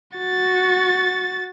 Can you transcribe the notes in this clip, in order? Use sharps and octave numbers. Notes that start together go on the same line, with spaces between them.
F#4 A6